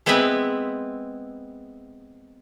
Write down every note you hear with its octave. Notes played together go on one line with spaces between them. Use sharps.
G#3 B3 C4 E4 B4 E5